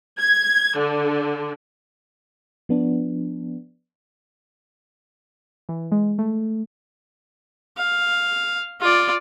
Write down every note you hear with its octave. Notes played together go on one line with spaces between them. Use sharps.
G#6
D3
F3 B3 D4
E3
G#3
A3
F5
F4 D5